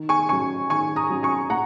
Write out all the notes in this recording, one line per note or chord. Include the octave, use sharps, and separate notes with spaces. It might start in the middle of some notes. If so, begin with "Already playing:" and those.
Already playing: D#3
G#5 C#6
F#3 C#4 G#5 C#6
D#3 G#5 C#6
A#5 D#6
F#3 C#4
G#5 C#6
A#2 F#5 A#5